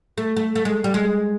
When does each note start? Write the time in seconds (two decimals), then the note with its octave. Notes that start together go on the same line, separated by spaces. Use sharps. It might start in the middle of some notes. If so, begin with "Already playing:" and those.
0.18 A3
0.37 A3
0.55 A3
0.65 G#3
0.84 G3
0.94 G#3